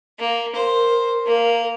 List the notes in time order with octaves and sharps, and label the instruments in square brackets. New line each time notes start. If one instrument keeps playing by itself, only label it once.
[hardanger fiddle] A#3
[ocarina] A#4 [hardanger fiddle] C5
[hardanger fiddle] A#3